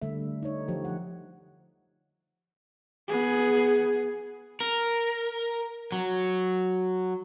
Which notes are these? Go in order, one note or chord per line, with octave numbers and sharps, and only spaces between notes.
D3 G3 A3 E5
D#4 C#5
F3 G4
F3 F#5
B3 G#4
A#4
F#3